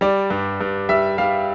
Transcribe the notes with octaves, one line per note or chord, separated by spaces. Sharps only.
G3 D5
G2
G2
G3 E5
G3 F5